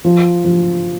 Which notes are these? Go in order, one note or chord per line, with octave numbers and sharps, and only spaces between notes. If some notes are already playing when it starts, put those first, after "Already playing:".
F3
F3